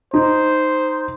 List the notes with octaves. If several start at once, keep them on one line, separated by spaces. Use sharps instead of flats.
D#4 C5